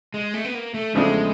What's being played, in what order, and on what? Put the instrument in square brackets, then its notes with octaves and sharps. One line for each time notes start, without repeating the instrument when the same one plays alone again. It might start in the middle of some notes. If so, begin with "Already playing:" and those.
[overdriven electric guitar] G#3
A3
B3
A#3
A3
[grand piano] E2 C#3 F3 A3 D4 [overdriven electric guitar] G#3